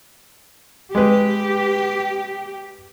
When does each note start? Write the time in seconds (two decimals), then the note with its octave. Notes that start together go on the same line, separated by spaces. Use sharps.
0.95 G#3 G4 B4